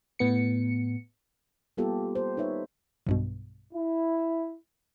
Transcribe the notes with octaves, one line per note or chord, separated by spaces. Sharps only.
A2 B3 C#7
G3 A#3 B3 F4 G4 A4
C5
D#4 B4 C#5 E5
B1 G2 B2
E4